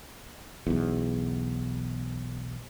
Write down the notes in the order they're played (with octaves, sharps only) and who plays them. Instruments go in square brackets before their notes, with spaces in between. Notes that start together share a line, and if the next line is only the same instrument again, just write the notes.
[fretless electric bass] B1 E2